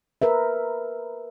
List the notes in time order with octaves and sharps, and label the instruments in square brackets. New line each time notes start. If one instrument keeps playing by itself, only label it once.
[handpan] A#4 B4 E5